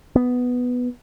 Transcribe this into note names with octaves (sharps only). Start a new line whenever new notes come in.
B3